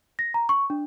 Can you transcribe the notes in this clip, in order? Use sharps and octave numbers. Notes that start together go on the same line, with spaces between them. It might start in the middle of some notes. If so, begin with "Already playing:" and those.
A#6
A#5
C#6
D4